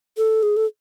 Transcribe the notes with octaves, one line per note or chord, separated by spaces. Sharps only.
A4
G#4
A4